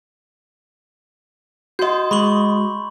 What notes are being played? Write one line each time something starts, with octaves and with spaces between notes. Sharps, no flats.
F#4 D#5 C6 G6
G#3 B5 C#6 F#7